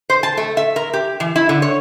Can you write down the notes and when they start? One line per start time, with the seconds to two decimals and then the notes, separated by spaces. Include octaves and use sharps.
0.10 C5
0.23 A5
0.37 A3
0.57 E5
0.76 A#4
0.94 G4
1.20 E3
1.36 E4
1.49 D3
1.62 C#5